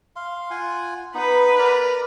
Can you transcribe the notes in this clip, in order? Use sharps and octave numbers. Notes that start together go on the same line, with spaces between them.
F5 C6
F4 F#5 G#5
B3 D#4 B4
A#4 D5 A#5